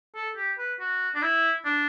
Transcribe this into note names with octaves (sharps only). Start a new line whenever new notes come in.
A4
G4
B4
F#4
D4
E4
D4